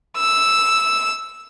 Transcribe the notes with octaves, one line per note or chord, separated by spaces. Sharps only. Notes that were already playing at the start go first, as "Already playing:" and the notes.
E6